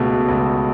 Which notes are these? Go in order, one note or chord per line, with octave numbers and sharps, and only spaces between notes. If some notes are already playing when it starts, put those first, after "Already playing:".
Already playing: C#2 B2 A3
C#2